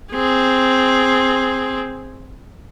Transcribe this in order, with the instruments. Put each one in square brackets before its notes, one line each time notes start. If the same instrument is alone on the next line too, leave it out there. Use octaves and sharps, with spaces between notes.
[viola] C4 G#4